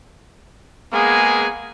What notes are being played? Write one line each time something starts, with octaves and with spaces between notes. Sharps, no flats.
G#3 A#3 B3 G#4 G#5